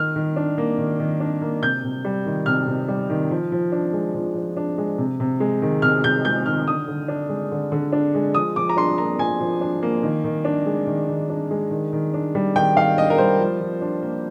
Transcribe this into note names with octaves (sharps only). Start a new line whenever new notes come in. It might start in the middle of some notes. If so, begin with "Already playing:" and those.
Already playing: D#3 F6
D#3
D4
A#3
D#3
D#3
D4
A#3
C3 G6
C3
G3
D#3
C3 F6
C3
G3
D#3
F3
F3
D4
G#3
F3
F3
D4
G#3
C3
C3
G#3
D#3
C3 F6
C3 G6
G#3 G6
D#3 F6
D3 D#6
D3
D4
G#3
D3
D3
D4
G#3
F3 D#6
F3 D6
A#5
D4 C6
A#3 A#5
F3 G#5
F3
D4
A#3
D#3
D#3
D4
G#3
D#3
D#3
D4
G#3
D#3
D#3
D4
G3
D#3 G5
D#3 F5
D4 D#5
A#4
G3 C5
F3
F3
D4
A#3